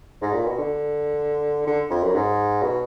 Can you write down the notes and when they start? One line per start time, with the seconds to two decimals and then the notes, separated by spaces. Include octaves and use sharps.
0.22 G#2
0.33 A#2
0.46 B2
0.58 D3
1.67 D3
1.90 F2
2.03 F#2
2.15 G#2
2.63 B2